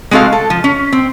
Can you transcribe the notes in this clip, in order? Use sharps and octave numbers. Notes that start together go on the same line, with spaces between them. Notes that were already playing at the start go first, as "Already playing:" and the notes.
G#3 C4 F#4 A4 F5
A4
F3
C#4
C4